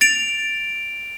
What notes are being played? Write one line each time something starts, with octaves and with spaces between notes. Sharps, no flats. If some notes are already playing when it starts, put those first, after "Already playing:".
A6 D7 F7